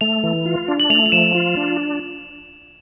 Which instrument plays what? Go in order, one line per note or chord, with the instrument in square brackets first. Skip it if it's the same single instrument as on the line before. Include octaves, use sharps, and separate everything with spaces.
[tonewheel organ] A3 [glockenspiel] F7
[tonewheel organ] E3
F4
D4
[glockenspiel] F#7
[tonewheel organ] A3 [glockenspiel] F7
[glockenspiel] F7
[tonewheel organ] F3 [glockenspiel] E7
[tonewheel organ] F4
D4